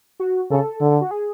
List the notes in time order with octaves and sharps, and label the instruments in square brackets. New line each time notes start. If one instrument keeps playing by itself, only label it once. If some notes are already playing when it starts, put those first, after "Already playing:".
[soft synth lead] F#4
[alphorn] C#3 [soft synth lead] A4
[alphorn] D3
[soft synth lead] F#4
G#4